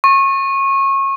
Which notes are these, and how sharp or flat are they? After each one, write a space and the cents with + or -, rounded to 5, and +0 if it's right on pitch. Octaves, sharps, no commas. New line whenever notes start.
C#6 -25